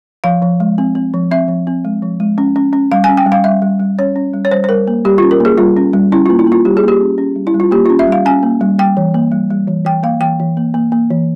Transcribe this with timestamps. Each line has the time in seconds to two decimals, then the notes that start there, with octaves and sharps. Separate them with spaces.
0.24 F3 F5
0.42 F3
0.60 G#3
0.78 C4
0.95 C4
1.14 F3
1.31 C4 E5
1.48 F3
1.67 C4
1.85 G#3
2.02 F3
2.20 G#3
2.38 C#4
2.56 C#4
2.73 C#4
2.92 G3 F5
3.04 G#5
3.09 C#4
3.17 G5
3.26 G3
3.32 F5
3.44 G3 E5
3.62 G3
3.80 G3
3.99 C#4 C#5
4.16 C#4
4.34 G3
4.45 C#5
4.51 G3 C5
4.64 C5
4.69 G3 A#4
4.88 A#3
5.05 G3 G4
5.18 F4
5.23 C#4
5.31 A#4
5.40 A#3 G#4
5.58 G3 F4
5.77 C#4
5.93 G3
6.12 C#4 E4
6.26 A#3 F4
6.39 E4
6.47 A#3 F4
6.65 G3 G4
6.77 G#4
6.83 A#3 G4
7.01 C#4
7.18 C#4
7.36 G3
7.47 E4
7.54 G3
7.60 F4
7.71 A#3 G4
7.86 C#4 F4
7.99 E5
8.07 G3 F5
8.26 C#4 G#5
8.43 A#3
8.61 G3
8.79 G3 G5
8.97 E3
9.14 A#3
9.32 G3
9.50 G3
9.68 E3
9.85 E3 G5
10.03 A#3 F5
10.21 E3 G5
10.40 E3
10.57 A#3
10.74 A#3
10.92 A#3
11.10 E3